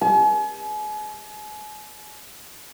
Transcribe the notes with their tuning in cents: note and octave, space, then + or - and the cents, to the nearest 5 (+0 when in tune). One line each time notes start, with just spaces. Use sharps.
G#5 +40